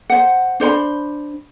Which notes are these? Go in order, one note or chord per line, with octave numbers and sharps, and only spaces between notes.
C5 F#5
D4 C5 C#5 B5